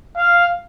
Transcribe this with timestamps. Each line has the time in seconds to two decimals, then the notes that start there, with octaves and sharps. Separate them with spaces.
0.17 F5